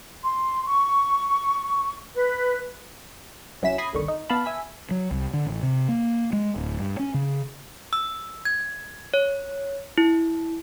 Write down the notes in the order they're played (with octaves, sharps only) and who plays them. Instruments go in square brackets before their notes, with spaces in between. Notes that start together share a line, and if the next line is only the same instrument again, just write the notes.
[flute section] C6
C#6
B4
[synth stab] C2 F#3 C#4 E4 B6 E7
B5 D#6 G#6 A#6 C7
G1 C2 D3 D#3 C#6
D#4
B3 F5 A5 B5
E5 G#5 B6
[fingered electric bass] F#3
C2
D3
A1
C3
A#3
G#3
D1
G2
C#4
C#3
[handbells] E6
G#6
C#5
E4